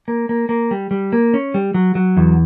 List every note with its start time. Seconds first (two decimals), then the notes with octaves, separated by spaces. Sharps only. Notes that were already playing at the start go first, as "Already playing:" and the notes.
0.08 A#3
0.29 A#3
0.49 A#3
0.71 G3
0.91 G3
1.13 A#3
1.34 C#4
1.54 G3
1.74 F#3
1.95 F#3
2.17 E2